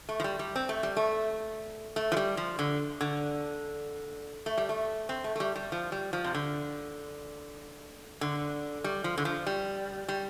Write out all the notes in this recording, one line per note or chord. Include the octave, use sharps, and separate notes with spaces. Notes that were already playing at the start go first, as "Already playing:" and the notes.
A3
F3
G3
G3
C4
A3
G3
A3
A3
F3
G3
F3
D3
D3
A3
G3
A3
C4
A3
A3
G3
G3
F3
G3
F3
C3
D3
D3
G3
F3
D3
F3
G3
G3